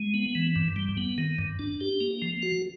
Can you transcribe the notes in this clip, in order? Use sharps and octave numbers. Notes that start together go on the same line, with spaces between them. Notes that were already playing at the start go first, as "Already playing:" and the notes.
Already playing: G#3
B3
E3
G2
G3
B3
D#3
G2
D4
G4
A#3
F3
F#4